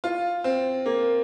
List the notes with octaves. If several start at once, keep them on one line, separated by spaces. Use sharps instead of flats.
F4
C4
A#3